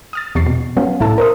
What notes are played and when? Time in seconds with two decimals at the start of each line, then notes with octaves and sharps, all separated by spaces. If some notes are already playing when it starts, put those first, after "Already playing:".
0.13 D#6 F6 A6
0.35 E2 C3 C#6 A6 C7
0.47 B2
0.77 F#3 B3 C#4 F4
1.00 C2 A2 E4 A4 A5 E6
1.18 A#4 C5 D#6